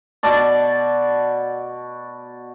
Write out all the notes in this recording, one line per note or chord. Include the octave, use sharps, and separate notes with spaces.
B2 F#4 D5 A5